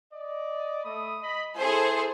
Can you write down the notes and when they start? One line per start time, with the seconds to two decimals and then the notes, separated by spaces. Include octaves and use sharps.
0.13 D5 D#5
0.84 A3 B5 D#6
1.23 D#5 B5
1.56 G#3 E4 G#4 A4 C5 G#5